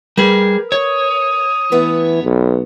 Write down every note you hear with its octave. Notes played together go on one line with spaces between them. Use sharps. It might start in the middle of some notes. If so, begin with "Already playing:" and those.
G3 G#4 A#4 B4
C#5 D#6
E3 A3 B3 B4
B1